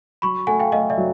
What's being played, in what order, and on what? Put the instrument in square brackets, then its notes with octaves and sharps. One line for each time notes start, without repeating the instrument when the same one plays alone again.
[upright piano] F#3 [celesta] B5 C#6
[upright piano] A3 [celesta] F#5 G#5
[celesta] F5 G5
[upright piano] A3 [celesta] D#5 F5
[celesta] D5 E5
[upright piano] F#3